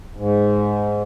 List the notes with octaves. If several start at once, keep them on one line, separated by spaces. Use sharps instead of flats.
G#2